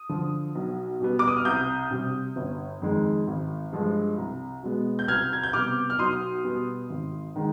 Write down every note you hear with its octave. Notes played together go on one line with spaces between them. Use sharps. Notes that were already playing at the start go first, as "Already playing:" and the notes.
Already playing: D#6
D3 F3
B1
B2 G3 B3
D6
D#6
F6
C2 D#6 G6
C3 G3
G1
F2 D#3 G#3
G#1
G2 F3 G#3
C2
B2 G#3 B3
G6
C2 F6 G#6
G#6
G6
C3 G3 B3 D6 F6
F6
B1 C6 D#6
B2 G3 B3
G#1
D#3 G#3